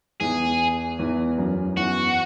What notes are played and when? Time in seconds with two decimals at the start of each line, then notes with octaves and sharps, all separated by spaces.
0.20 E2 E3 G#4
0.99 E2 E3
1.38 F#2 F#3
1.76 E2 E3 F#4